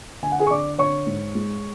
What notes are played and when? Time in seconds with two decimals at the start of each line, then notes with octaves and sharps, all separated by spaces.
0.23 D3 G#5
0.32 F#5
0.39 G#4 G#5
0.47 C#6
0.51 D3 D5 D6
0.78 D3 C#5 C#6
1.07 G#2
1.35 G#3